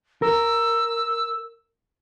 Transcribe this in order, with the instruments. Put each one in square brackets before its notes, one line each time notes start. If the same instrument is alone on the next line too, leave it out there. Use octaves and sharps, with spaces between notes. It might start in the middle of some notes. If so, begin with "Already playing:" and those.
[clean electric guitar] A#4 [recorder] E6